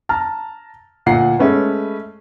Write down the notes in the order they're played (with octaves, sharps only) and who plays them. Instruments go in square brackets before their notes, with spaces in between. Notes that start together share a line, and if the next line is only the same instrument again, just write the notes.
[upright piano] A5 A#5 F6
D2 A#2 F#5 A#5 C7
G#3 A3 C#4 B4